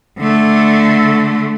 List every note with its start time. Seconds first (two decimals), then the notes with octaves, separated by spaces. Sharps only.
0.19 D3 A3